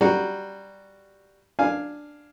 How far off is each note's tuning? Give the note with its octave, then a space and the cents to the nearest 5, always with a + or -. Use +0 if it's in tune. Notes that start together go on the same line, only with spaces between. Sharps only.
G3 +0 F#4 +0 A#5 +0
D4 +5 F5 +0 G#5 +0